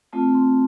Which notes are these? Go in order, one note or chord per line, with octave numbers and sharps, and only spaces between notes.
A3 C4 F4 A5
C6